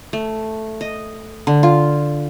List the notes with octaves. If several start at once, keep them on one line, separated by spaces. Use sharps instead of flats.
A3
D#5
D3
F4